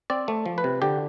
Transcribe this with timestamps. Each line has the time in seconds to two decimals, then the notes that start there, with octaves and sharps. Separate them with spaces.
0.10 C4 D5
0.28 A3
0.46 F3
0.58 B4
0.64 C3
0.82 D3 G4